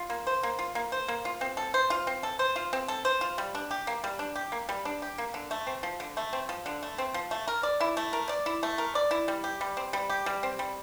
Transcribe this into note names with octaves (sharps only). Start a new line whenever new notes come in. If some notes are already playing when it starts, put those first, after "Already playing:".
Already playing: F4
A#3
C5
A#3
F4
A#3
C5
A#3
F4
C4
A4
C5
F4
C4
A4
C5
F4
C4
A4
C5
F4
G3
D4
G4
A#3
G3
D4
G4
A#3
G3
D4
G4
A#3
D3
A3
C4
F3
D3
A3
C4
F3
D3
A3
C4
F3
A3
A#4
D5
E4
A3
A#4
D5
E4
A3
A#4
D5
E4
G3
G4
G3
C4
G3
G4
G3
C4
G3